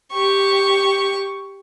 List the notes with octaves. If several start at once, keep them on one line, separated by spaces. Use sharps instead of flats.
G4 C#6